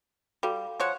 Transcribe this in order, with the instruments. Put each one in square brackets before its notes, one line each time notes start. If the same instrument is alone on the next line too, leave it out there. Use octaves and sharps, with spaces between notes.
[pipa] G3 [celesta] F#4 A4 F5
[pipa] F3 C#5 F#5